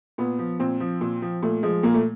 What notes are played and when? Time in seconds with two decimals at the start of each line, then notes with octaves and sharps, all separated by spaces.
0.18 A#2 B3
0.39 F3
0.60 A#2 C4
0.80 F3
1.01 A#2
1.22 F3
1.42 A#2 A3
1.63 F3 G#3
1.83 A#2 A#3
1.94 A3